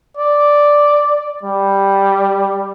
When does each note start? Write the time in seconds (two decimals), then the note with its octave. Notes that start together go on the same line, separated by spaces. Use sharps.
0.17 D5
1.43 G3